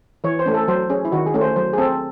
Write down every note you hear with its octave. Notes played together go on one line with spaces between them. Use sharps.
E3 C#5
C5
A3 C#4
A4
F#3 C5
C#4 G#4
E4
D#3 F#4
G#4
A3 C#4
C5
F#3 C5
G#4
C4 A4